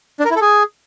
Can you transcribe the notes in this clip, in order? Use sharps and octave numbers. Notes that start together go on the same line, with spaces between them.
D4
A#4
E4
A4
G#4